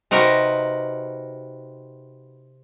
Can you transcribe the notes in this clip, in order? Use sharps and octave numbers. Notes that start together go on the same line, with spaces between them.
C3 D#4 F#4 A#4 B4